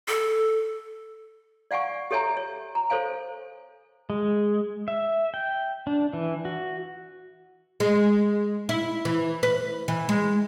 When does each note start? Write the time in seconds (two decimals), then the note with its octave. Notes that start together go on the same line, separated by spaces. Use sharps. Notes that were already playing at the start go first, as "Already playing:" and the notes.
0.08 A4
1.71 D5 F5 F#5 G#5 C#6
2.11 G4 A4 C#5 E5 G#5 A#5
2.37 C#5
2.75 A#5
2.90 A4 C5 C#5 F5 G#5
4.10 G#3
4.88 E5
5.34 G5
5.87 D4
6.13 E3
6.45 F#4
7.80 G#3
8.69 E4
9.05 E3
9.43 B4
9.88 E3
10.09 G#3